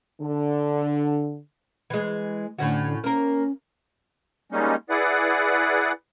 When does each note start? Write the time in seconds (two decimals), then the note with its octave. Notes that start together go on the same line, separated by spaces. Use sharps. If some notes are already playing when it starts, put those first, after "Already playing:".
0.21 D3
1.90 E3 G#3
2.59 A2 D3 C#4 F#4
3.04 A#3 C#4 A#4
4.52 G3 G#3 A#3 C#4 D#4
4.90 E4 G#4 B4 D5 F#5